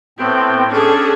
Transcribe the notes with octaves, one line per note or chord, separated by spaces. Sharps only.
A2 B3 C4 G5
C#4 D4 G#4 A4